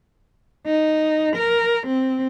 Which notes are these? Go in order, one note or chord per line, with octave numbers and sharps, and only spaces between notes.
D#4
A#4
C4